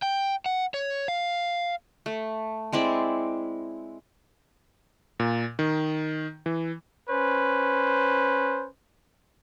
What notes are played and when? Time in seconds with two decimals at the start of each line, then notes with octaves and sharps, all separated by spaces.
0.02 G5
0.46 F#5
0.74 C#5
1.08 F5
2.06 A3
2.73 G#3 C4 E4 D5
5.20 A#2
5.59 D#3
6.46 E3
7.08 C#4 B4 C5